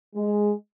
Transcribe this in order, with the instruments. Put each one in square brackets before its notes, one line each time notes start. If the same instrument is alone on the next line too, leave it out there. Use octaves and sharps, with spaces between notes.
[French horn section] G#3